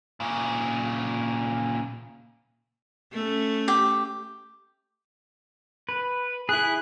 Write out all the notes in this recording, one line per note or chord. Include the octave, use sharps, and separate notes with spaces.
A#2 C#3
A3 C#4
G4
B4
E4 G#4 F#6